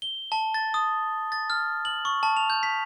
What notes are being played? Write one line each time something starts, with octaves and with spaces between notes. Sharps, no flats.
G7
A5
A6
D#6
A6
F6
F#7
C#6
A5
F7
G6
B6